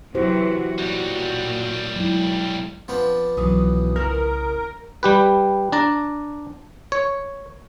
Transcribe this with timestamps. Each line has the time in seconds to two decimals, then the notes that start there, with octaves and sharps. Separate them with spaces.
0.15 C3 E3 F#3 E4 F#4 G4 C5
0.78 B1 A#2 G3
1.96 F#3 G#3 E4
2.88 F3 B3 C4 D4 F4
3.37 C2 B2 E3 F#3 D#6
3.96 C#3 E4 A#4
5.03 G3 G4 B4
5.72 D4 A5 A#5
6.92 C#5